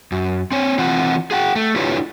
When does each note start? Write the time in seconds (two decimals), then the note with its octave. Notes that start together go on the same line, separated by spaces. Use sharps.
0.12 F#2
0.52 C4 C#5
0.79 E3 C4 F4 F#5
1.31 G#4 F#5 G5
1.55 A3
1.76 D4 E4 F4 G4 B4 C#5